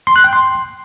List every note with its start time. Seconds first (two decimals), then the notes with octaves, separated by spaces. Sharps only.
0.07 C6
0.16 F#6
0.24 G5
0.33 C6